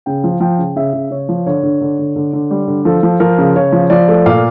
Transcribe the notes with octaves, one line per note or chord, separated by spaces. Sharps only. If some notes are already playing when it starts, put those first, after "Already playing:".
C#3 G5
F3
F3 G5
C#3
C#3 E5
C#3
C#3 C#5
F3
D3 C#5
D3
D3
D3
D3
D3
G3
D3
F3 A4
F3
F3 A#4
C#3
C#3 C#5
F3
F3 D5
A3
A#2 F5